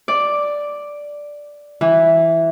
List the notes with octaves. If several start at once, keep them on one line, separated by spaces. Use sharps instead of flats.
D5
E3